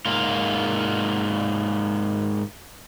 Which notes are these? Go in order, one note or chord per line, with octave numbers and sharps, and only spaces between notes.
G#2 A#3 F4